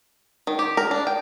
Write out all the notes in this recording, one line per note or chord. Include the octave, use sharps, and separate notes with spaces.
D#3
G4
A#4
D4
G5